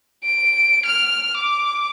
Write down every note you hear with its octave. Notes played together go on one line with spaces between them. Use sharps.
D7
F6
D6